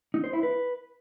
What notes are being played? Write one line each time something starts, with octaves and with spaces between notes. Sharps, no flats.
D#4
C5
E4
B4